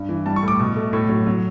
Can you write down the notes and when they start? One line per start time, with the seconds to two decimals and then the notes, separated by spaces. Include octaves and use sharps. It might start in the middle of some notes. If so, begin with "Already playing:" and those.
Already playing: G2
0.09 E3
0.26 G3 A5
0.36 C#6
0.43 A2
0.48 D6
0.60 B2
0.76 A3
0.93 A2 C#6
1.09 F#3
1.26 F#3